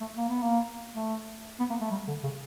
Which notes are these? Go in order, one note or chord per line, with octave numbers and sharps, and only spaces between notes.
A3
A#3
B3
A#3
A3
B3
A#3
A3
G3
D3
C#3